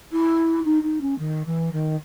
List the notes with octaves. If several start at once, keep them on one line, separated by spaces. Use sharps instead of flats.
E4
D#4
D#4
C#4
D#3
E3
D#3